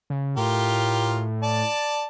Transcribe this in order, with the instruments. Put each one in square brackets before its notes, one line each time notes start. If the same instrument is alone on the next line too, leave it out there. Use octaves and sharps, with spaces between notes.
[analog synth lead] C#3
[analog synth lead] A2 [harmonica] F4 G4 A#4
[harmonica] D5 A5